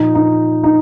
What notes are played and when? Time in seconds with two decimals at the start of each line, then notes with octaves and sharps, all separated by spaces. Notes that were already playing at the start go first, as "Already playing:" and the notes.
Already playing: A#2 F3 D#4
0.15 D#4
0.63 D#4